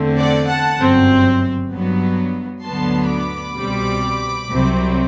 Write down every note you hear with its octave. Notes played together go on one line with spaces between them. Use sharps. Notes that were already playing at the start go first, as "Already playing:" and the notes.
Already playing: E2 D3 A3 C4
D5 F#5
F#5 A5
G1 F#2 F#3 C4
G2 F#3 B3
D2 D3 F#3 B3 A5 C6
B5 D6
C2 B2 G3 C4
C2 C3 F#3 C4